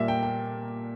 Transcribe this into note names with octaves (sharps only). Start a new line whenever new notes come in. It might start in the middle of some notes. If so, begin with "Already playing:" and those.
Already playing: A#2 G3 A#3 D5 E5
G5
G5